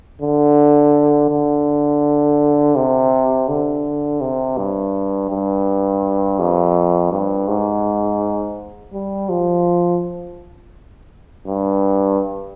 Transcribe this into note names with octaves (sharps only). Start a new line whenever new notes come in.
D3
D3
C3
D3
C3
G2
G2
F2
G2
G#2
G3
F3
G2